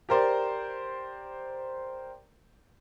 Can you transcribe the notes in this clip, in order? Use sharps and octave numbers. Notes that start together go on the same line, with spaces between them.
G4 A#4 C5 D5